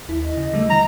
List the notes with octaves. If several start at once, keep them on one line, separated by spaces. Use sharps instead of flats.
D#2 E4
D#5
C#3
D3 G3 A3
E3 A#5